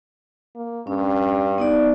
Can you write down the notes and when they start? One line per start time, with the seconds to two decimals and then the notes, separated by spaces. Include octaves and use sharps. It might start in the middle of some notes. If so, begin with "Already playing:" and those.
0.55 A#3
0.87 G2 C#4
1.58 B3 D#4 D5